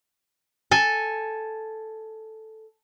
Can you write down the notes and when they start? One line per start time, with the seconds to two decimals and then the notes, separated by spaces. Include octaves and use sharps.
0.71 A4 G#5